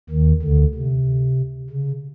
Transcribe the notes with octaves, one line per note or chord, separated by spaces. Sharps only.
D#2 D#3
D2 D3
C3
C#3